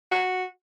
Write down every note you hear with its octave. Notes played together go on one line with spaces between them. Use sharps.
F#4